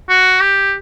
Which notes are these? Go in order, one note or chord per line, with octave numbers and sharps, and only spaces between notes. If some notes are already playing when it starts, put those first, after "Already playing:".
F#4
G4